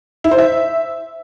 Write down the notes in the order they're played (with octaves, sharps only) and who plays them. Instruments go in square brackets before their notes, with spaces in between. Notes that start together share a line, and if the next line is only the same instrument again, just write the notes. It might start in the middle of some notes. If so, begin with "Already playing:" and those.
[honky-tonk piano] E4
C5
E5